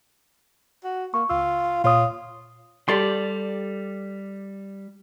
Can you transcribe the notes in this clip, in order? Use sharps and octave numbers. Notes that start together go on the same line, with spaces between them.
F#4
A#3 C#6
C#2 F4 E6
A#2 F4 C#5 D#6
G3 G4 A4 D5 C6